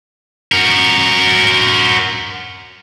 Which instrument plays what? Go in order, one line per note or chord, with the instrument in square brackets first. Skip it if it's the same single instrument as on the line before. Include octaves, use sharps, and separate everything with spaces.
[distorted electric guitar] F#4 A#4